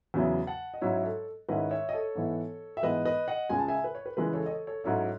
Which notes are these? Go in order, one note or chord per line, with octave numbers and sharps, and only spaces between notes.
E2 C#3 F#3 C#4 E4
F#5 A5
D#5
G#2 F#3 C#4 E4 C#5 E5
A4 C#5
G#2 D#3 G#3 C#4 E4 B4 D#5
C#5 E5
D#5
A4 C#5
G#2 E3 B3 E4
E5
G#2 E3 G#3 B3 B4 D#5
B4 D#5
D#5 F#5
C#2 C#3 G#3 G#5
A5
E5 G#5
B4
C#5
B4
C#3 E3 G#3 B4
A4 C#5
D#5
A4 C#5
A4 C#5
G#2 F#3 C#4 E4 A4 C#5